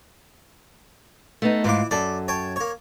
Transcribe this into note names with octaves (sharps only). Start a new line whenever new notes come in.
A3 B3 D#4
G#2 E3 F4 D6
F#2 A4 D5
C#5 G5 A5
A#3 C#5